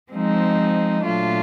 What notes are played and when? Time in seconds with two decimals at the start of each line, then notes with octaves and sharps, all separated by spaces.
0.12 F3 G#3 C4 D#4
1.04 A#2 F#3 A3 D4 F4